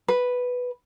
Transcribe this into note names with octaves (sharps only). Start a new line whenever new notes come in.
B4